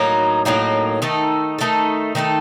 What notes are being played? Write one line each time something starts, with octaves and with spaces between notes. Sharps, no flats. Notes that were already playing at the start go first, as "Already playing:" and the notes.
Already playing: A2 F#3 A#3 D#4
A2 F#3 A#3 D#4
D#3 A3 D#4 A4
D#3 A3 D#4 A4
D#3 A3 D#4 A4